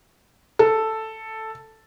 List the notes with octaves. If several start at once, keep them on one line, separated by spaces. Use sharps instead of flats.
A4